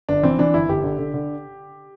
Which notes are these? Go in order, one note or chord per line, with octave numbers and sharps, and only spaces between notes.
G1 D4
E3 C4
E3 D4
G1 E4
G1 G4
D3
D3
D3